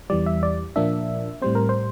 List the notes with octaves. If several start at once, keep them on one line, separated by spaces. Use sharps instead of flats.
E2 E3 G3 D5
E5
D5
A#2 F3 A#3 D4 E5
A2 G3 C4 C5
A#4
C5